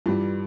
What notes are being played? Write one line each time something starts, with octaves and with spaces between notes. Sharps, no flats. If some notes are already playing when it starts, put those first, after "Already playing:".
G2 E3 G3 F4